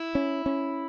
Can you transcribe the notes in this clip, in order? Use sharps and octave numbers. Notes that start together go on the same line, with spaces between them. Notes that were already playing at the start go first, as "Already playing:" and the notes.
Already playing: E4
C#4
C#4